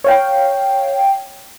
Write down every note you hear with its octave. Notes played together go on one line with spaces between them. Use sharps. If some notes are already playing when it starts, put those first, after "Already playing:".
C#5 F5 G5